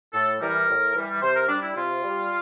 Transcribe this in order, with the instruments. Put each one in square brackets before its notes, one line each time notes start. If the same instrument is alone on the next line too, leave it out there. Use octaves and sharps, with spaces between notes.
[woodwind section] A2 A4
E3 G3 A#4
A2
E3 G3
C3 C5
A#4
G3 D4
E4
C3 F4
G3